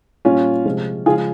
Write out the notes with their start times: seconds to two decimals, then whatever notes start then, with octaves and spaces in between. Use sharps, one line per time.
0.25 A#2 G3 C#4 F4
0.65 C3 F3 G#3
1.06 C#3 F3 G#3 F4 G#4